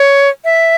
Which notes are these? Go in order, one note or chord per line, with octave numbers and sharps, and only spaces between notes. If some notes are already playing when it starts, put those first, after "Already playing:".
Already playing: C#5
E5